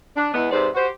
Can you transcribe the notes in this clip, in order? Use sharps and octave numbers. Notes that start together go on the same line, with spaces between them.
D4
E2 E3 G#3 B3
G#2 C3 B4 C5 D5
F#4 G4 C5